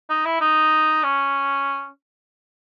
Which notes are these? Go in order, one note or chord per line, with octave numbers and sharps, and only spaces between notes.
D#4
E4
D#4
C#4